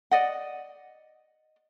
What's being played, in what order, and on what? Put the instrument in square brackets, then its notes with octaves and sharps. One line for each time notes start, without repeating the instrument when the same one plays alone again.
[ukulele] D5 D#5 F#5